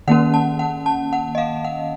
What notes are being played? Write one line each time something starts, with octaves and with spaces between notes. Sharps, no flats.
D#3 A#3 C#4 F#5
A5
F#5
A5
F#5
D#5
F5
F#5